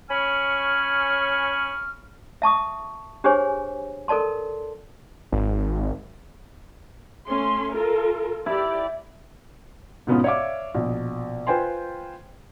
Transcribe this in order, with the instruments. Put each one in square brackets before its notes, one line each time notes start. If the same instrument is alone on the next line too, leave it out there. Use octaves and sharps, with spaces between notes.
[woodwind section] C#4 C#5 G#5 B5 C#6 F6
[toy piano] E5 A5 C#6 D#6
D4 G4 G#4 C5 C#5 G#5
A4 A#4 D5 A5 C6
[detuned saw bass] G#1
[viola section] A3 C#4 C6
F4 A4 A#4
[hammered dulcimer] E4 [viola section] G4 D5
[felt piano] G#2 B2 B3 C#4 F4
C#5 D5 E5 F5 D6
A#1 B2
F4 B4 C5 G5 G#5 C6